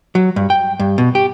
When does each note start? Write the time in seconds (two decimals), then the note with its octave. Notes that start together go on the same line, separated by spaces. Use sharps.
0.15 F#3
0.36 G2
0.50 G5
0.79 G2
0.98 B2
1.15 G4